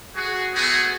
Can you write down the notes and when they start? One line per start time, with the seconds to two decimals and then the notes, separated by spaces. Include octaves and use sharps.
0.16 F#4 G#4
0.55 A3 B3 F#4 G#4